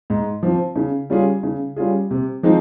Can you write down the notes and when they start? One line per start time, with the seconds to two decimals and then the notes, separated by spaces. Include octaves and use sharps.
0.10 G#2
0.43 F3 C4
0.76 C#3
1.10 G3 C#4 F4 G#4
1.43 C#3
1.76 G3 C#4 F4 G#4
2.11 C3
2.43 F3 G#3 C4 D#4